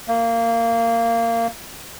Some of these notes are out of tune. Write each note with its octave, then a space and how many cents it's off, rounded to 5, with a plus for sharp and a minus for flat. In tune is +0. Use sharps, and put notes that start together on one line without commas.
A#3 -20